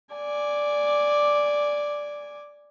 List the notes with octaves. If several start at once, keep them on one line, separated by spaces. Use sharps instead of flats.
D5 G#5